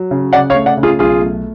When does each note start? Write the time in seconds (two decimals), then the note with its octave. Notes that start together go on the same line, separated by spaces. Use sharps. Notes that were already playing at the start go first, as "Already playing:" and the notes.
Already playing: F#3
0.11 C#3
0.33 C#3 D5 F#5
0.50 C#5 F5
0.55 A3
0.66 D5 F#5
0.77 C#3
0.83 F4 G#4
0.99 B1 F4 G#4
1.21 A3